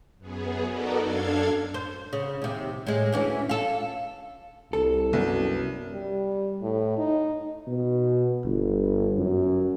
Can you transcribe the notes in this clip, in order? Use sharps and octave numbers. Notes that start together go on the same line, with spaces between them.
F#2 B3 G#4
B3 D#4 F#4 A4 A#4 D5
F#2 D4 A4 F5 G#6
C5
C#3
D#2 C3
A2 G#3
D2 E3 C#4
F4 A4
C2 A4
C2 F#2 B3
G3
A2
D#4
B2
G1
F#2